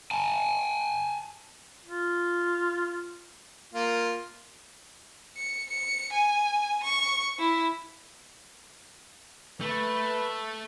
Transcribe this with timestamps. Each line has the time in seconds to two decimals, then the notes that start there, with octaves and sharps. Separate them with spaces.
0.11 G#5 A5
1.86 F4
3.74 A#3 F4
5.37 C#7
5.69 C#7
6.12 G#5
6.83 C#6
7.39 E4
9.61 A3 B4